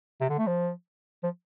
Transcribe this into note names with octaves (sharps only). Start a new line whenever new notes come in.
C3
D3
A3
F3
F3